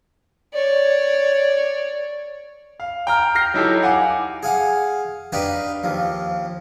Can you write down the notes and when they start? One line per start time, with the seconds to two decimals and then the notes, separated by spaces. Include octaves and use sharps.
0.53 C#5 D5
2.80 F5
3.07 G5 A#5 F6
3.35 F6 G6 A#6 C7
3.54 F#3 D#4 E4 G4 A4
3.82 F5 F#5 G#5 D6
4.43 G#4 F5 F#5
5.32 D4 D#4 G4 B4 F5
5.84 D#2 F3